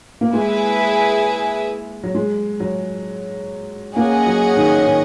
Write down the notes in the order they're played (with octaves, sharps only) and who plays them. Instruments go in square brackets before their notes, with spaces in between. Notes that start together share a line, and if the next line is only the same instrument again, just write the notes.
[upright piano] A#3
[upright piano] G#3 [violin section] E4 G#4 B4 E5 G#5
[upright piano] F#3
G#3
F#3
[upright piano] A#3 [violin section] C#4 G#4 D#5 F#5
[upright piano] F#3
D#3
D#3